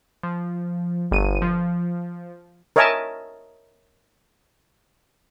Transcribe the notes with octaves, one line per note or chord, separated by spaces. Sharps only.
F3
G1 D#7
F3
A#4 C#5 D#5 E5 G#5 A5